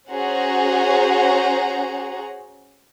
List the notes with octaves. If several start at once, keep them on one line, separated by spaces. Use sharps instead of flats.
C#4 F#4 G#4 C5 F#5 A#5